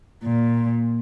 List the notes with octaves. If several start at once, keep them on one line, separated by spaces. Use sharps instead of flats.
A#2